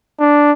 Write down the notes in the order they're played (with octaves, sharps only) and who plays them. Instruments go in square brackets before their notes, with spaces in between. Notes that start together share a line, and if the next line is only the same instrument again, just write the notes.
[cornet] D4